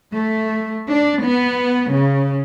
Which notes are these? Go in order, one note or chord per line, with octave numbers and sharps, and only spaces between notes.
A3
D4
B3
C#3